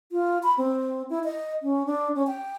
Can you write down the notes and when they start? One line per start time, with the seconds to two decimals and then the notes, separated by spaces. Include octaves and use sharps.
0.12 F4
0.43 B5
0.58 C4
1.10 E4
1.24 D#5
1.63 C#4
1.86 D4
2.16 C#4
2.27 G5